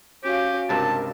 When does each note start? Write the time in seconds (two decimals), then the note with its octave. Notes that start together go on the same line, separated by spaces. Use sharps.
0.24 C#4 F#4 G4 F5
0.69 C#2 G2 C3 A#4 A5